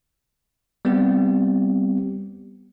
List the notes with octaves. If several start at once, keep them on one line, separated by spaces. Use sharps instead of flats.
G3 B3 C4 G4